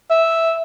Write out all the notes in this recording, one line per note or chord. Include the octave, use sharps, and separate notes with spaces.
E5